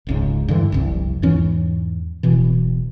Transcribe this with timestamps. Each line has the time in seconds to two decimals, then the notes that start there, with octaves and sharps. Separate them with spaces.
0.07 D1 C#2 G#2
0.48 G2 D3 E3
0.72 F1 C2
1.22 E2 G#2 E3 C#4
2.23 D1 B2 E3